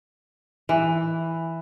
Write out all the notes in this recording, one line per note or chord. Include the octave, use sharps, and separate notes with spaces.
E3